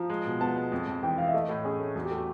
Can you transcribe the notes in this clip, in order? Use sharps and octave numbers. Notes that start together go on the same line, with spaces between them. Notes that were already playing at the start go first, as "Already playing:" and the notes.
Already playing: F3 A#5
G#3
B2
B3 A5
G#3
F2
F2
E3 G5
E3 F5
E5
A3 D#5
A2 A4
C#4 G#4
A3
E2 F#4
G4
A3 F#4